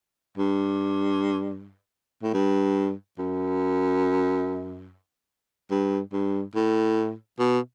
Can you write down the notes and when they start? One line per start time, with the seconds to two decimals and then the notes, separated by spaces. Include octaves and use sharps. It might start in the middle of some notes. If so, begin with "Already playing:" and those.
0.38 G2
2.22 A2
2.34 G2
3.18 F#2
5.71 G2
6.13 G2
6.55 A2
7.39 B2